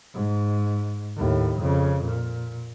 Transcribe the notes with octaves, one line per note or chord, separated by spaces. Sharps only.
G#2
D#2 A2
F2 C#3
A#2